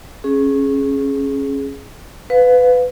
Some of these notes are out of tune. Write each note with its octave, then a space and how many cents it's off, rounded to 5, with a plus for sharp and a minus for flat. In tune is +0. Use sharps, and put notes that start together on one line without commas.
C#4 -20 G#4 +15
B4 +20 F5 +30